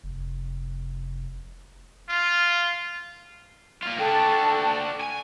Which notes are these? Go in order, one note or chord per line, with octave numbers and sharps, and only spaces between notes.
F1
F4
A#3 F4
D4 F#4 A4 G5 A5
G#5